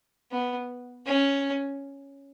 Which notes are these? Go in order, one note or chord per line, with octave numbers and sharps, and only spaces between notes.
B3
C#4